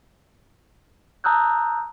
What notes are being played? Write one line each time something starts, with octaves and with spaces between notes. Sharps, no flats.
A5 A#5 D#6 E6 F#6 G6